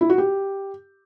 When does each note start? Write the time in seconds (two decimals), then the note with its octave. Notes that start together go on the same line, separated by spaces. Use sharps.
0.01 E4
0.10 F#4
0.18 G4